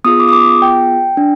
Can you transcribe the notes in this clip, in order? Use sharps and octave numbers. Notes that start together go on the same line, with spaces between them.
B3 F4 G#4 D#6
D6
D#6
D6
G5
D4